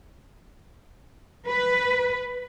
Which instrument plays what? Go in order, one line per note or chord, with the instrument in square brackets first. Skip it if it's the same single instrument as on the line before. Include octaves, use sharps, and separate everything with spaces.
[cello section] B4